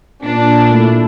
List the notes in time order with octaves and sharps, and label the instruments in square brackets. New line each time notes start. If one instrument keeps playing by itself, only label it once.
[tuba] A#2 [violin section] D4
[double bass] A3 E4